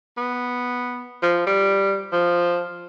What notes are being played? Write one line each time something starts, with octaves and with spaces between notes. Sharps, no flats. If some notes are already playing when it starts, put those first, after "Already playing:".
B3
F3
G3
F3